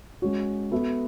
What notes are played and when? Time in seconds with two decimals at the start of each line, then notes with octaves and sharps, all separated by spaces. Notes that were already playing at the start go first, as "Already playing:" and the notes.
0.22 G#3 C#4 F#4 C#5
0.71 B3 F#4 A4 E5